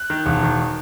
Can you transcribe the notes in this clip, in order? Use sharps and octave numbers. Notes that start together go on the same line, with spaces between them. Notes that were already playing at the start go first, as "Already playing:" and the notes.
Already playing: F#6
D#3
E1
D#3